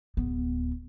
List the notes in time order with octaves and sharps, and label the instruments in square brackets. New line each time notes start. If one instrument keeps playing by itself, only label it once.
[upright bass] D1 B3